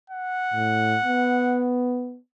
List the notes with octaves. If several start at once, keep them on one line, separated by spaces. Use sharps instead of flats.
F#5
A2
B3